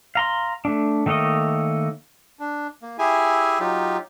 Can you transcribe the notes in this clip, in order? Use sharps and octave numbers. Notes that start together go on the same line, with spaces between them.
F5 A#5 C6
A3 D4
D#3 A3 A#3 C#5 D#5
D4
A#3
E4 G4 G#4 E5 G#5
F#3 D#4 F4 G4